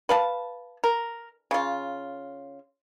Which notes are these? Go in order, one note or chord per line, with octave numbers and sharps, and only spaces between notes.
B4 F5 A5
A#4
C#3 F4